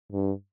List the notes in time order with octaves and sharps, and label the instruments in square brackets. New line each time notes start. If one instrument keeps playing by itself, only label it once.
[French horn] G2